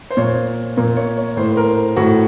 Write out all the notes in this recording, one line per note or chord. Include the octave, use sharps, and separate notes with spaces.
C5
A#2 C#5
A#2 A#4
C#5
C#5
A2 C5
C5
A#4
A2 F#4